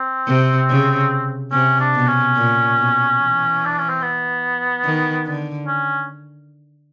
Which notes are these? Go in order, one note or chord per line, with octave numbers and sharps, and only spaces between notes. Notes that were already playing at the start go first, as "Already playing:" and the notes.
Already playing: C4
C3
C#3
C3 C#4
D4
B2
C#4
A#2
B2
E3
D4
C#4
C4
B3
D#3
D3
C#4